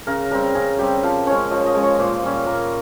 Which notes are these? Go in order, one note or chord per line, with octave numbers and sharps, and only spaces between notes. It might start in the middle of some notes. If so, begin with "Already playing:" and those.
C#3 A#4
G3 C4 A#4
C#3 G#4
G3 C4 G4
F3 A#4
G#3 C#4 C#5
F3 D#5
D#5
G#3 C#4
C#5
A#2 C5
G3 C#4
A#2 A#4